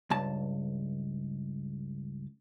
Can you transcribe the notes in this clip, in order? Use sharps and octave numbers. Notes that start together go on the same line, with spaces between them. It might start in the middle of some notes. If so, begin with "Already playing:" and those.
C#2 G2 A5